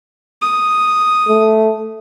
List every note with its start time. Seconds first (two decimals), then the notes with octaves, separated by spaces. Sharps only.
0.41 D#6
1.29 A3